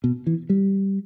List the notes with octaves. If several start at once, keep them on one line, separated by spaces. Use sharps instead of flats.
B2
E3
G3